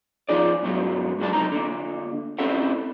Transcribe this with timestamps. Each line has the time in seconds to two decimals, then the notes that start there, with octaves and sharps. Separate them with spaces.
0.29 F3 D#4 G#4 D5
0.63 G2 B2 F#3 G#3
1.19 G#2 F#3 G#3 A5
1.33 B1 C3 D#4 A#5
1.52 D3 A#3
2.39 C4 C#4 E4 G4 A4 F#5